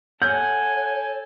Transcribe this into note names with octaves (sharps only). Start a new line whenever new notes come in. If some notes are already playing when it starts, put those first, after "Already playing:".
A4 C#5 F#5 G#5 G6